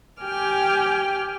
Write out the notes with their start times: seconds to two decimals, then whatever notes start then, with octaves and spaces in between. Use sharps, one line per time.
0.21 G4 G5 G#5 D6 F6